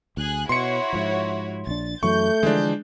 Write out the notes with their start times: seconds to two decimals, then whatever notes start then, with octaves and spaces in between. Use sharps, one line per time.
0.17 D2 G#4 G#5 F#6
0.49 B2 E4 F#4 C#5 C6 C#7
0.93 G#2 F3
1.67 A#1 D4 A6
2.03 F#2 E3 F#3 A3 C#6 G6
2.43 D3 E3 F3 G#3 D4